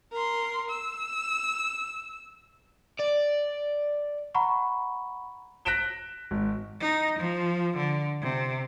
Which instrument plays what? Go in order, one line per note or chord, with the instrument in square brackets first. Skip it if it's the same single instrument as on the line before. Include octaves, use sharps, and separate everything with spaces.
[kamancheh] A#4 C6
E6
[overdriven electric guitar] D5
[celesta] F#5 A#5 B5 C#6
[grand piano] F#6 A#6 B6 D7 E7 G7
G#1
[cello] D#4
F3
D3
C3